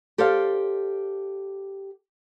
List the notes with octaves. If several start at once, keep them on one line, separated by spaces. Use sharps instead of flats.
G4 A4 C5 D5 F5